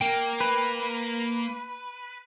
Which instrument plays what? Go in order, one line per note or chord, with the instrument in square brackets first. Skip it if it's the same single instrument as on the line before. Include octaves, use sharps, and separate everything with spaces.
[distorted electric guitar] A#3 [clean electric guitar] G5
[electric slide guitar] B4